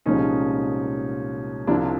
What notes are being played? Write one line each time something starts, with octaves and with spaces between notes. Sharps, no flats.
C2 A#2 F3 G#3 C#4 D#4
C2 C3 F3 D4 E4